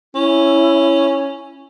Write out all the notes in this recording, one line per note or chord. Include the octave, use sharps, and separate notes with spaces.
C#4 E4